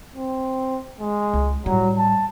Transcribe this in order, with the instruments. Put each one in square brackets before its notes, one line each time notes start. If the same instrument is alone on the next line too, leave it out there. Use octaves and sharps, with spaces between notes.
[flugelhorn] C4
G#3
[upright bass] C#2
[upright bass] A2 G3 [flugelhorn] F#3
[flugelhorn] A5